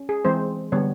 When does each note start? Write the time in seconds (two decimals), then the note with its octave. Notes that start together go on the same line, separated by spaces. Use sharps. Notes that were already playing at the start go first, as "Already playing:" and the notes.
Already playing: C#4
0.09 G#4
0.25 E3 G#3 C4 C5
0.72 D3 G3 B3 C#5